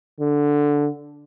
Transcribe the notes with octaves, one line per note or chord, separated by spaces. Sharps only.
D3